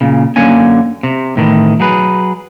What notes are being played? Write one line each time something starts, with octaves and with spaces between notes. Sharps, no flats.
A#2 C#3
F#2 D3 A#3 C#4 G#5
C3
A2 D#3 E3
F#3 G#4 B4